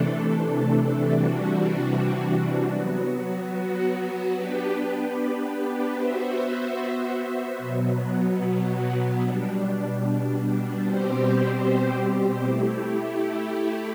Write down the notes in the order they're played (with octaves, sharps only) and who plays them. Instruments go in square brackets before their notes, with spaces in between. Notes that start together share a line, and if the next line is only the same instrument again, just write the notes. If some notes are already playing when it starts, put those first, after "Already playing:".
Already playing: [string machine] C3 E3 A3 D4 A4
C3 E3 G3 D4 F#4
F#3 B3 F#4
B3 D4 G4 B4
B3 F#4 C5 E5
B2 F#3 B3
B2 G3 D4
B2 G3 C4 G4 C5
A3 E4 G4